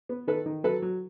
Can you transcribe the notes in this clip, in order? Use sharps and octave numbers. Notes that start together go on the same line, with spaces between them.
B3
D#3 A4 B4
D#3
F#3 A4 B4
F#3